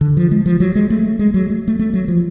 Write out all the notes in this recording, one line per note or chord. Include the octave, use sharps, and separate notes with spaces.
D3
F3
G#3
F3
F#3
G#3
A3
G#3
F#3
A3
A3
A3
F#3
F3